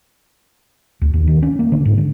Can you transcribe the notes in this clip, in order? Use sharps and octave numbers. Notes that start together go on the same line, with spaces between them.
D2
D#2
D#3
C#4
A#3
D3
G#2
D3